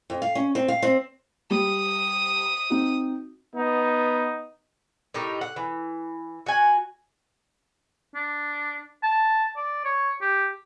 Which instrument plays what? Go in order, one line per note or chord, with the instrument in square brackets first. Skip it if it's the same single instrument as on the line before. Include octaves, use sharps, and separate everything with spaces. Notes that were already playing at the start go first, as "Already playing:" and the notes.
[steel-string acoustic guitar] F2
F5
C#4
C4
F5
C4
[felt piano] G3 [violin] D#6
[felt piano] C4 D#4 F#4
[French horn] B3 [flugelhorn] D#4
[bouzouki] A2 D#4 G4 A#4
F#5
E3
F#4 G#5
[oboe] D4
A5
D5
C#5
G4